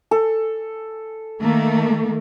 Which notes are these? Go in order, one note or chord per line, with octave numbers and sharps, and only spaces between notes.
A4
D#3 A3 A#3